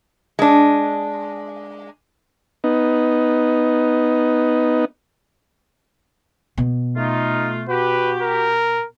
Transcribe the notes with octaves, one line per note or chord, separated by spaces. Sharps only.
G#3 D4
B3 D#4
B2
A3 D#4 F4
F#4 G4 B4
A#4